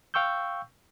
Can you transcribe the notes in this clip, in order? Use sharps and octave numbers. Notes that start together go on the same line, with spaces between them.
F5 G5 C#6 E6 G6